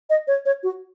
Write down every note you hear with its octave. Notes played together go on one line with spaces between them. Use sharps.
D#5
C#5
C#5
F#4